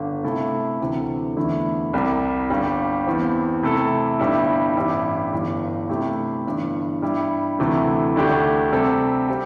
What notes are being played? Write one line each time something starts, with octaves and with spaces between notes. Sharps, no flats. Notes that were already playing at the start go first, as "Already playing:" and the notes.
Already playing: G1 D3
C3 A3 E4 A4
D2 C3 E3 C4
E2 D3 A3 E4
C2 C3 G3
G1 G2 G3
E2 E3 C4
C3 A3 E4 A4
G1 G2 G3 E4
A1 G2 G3 E4 G4
G1 G2 E3 G3
C3 A3 E4 G4
G1 G2 E3
G2 G3 E4
D2 C3 E3 A3
D2 D3 A3 D4 G4
C3 G3 C4 A4
C4 G4